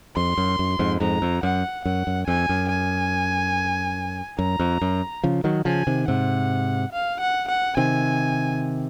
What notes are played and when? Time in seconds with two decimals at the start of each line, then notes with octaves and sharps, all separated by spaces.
0.16 F2 C6
0.38 F#2
0.59 F#2
0.79 F2 G#2
1.00 F2 G#2 A#5
1.22 F2
1.43 F#2 F#5
1.85 F#2 F#5
2.07 F#2
2.27 F2 G#5
2.49 F#2
2.69 G#5
4.39 F#2 A#5
4.59 F2
4.82 F#2
5.23 C#3 F3
5.44 D#3 F#3
5.65 C#3 F3 G#5
5.87 C3 D#3
6.08 G#2 C3 F#5
6.92 F5
7.21 F#5
7.49 F#5
7.77 C3 D#3 G#5